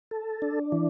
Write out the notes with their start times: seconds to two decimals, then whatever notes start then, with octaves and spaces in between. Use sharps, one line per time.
0.11 A4
0.42 D4
0.72 E3